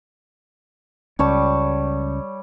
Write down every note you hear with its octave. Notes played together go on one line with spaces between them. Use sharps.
C#2 G3 C#4 C#5 A5